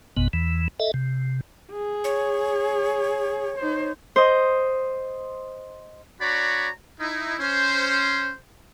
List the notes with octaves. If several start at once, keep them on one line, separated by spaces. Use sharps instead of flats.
G#1 F2 B2 B3
E2 E3
A4 D#5 E5
C3
G#4
C#5
D#4 C5
C5 D#5
D4 F#4 C#5 D5 A#5 B5
D#4 E4
C#4 C5